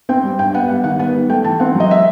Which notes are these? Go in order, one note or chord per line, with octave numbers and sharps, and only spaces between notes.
C4 G5
G3
G2 G5
B3 F#5
G3 F#5
D#3 F#5
B3 F#5
G3
A3 G5
E3 A5
C4 F#5
F#3 D#5
E5